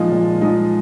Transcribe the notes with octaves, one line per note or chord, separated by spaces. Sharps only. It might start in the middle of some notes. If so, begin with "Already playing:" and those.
Already playing: A#2 F3 G#3 D#4
A#2
F3 G#3 D#4